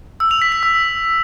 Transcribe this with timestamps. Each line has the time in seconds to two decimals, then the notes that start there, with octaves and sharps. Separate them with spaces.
0.20 E6
0.31 F7
0.42 B6
0.52 B6
0.63 E6